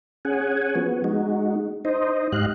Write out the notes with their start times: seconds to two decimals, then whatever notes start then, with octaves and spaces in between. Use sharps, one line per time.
0.25 C#4 G#4 F#5 G#5
0.75 F3 B3 F#4
1.04 G#3 D#4 F#4
1.85 D#4 C5 D#5
2.32 G#2 G4 D#5 F5 F#6